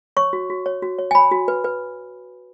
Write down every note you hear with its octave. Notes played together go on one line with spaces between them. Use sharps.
C#5 C#6
F#4
F#4
C#5
F#4
C#5
G#5
C#5 B5
F#4
B4
B4